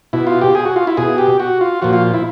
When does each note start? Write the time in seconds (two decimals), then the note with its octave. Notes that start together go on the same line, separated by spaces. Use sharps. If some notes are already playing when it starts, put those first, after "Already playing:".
0.13 B2 E4
0.27 F4
0.42 G4
0.55 G#4
0.65 F#4
0.76 F4
0.87 E4
0.97 B2 G#4
1.18 G4
1.40 F#4
1.61 F4
1.82 A#2 F3 F#4
1.93 F4
2.14 E4